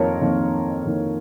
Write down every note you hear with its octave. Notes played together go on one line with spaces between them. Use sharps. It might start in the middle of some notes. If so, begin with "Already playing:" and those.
Already playing: F2 D#3 A#3 F4 A#4 C#5
F2 D#3 A#3
F2 D#3 A#3